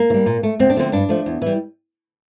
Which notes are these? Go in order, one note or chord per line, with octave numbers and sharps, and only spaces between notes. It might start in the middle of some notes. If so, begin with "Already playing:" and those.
Already playing: A#3
E3
G3
A#2
A3
D2 C4
D4
D3 F3 A3 C4
G2 D4
F3 A3
E2
E3 G3